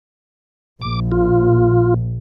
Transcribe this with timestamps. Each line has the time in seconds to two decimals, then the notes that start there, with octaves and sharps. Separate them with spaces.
0.82 A#1 D6
1.12 F4